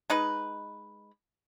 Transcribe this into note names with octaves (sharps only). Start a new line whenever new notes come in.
G#3 D#4 B4